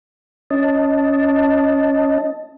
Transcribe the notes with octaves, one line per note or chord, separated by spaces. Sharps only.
C#4 D#5 A5